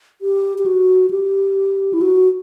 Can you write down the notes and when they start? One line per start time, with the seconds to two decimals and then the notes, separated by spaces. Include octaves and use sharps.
0.21 G4
0.58 G4
0.66 F#4
1.11 G4
1.93 E4
2.01 F#4